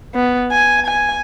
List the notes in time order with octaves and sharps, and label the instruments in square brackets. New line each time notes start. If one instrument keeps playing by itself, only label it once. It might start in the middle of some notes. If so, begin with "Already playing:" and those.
[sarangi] B3
G#5
G#5